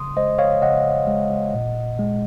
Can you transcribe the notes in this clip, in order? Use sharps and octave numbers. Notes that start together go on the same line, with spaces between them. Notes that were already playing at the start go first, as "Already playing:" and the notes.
Already playing: C#3 C6 D#6
G#3 C5 D#5
C#5 F5
C#3 D#5 F#5
G#3
A#2
G#3